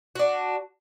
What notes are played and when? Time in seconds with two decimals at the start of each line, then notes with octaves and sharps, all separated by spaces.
0.15 D4 F#4